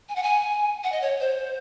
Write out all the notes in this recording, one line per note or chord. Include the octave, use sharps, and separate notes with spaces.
G#5
F#5
G#5
F#5
D#5
C#5
C5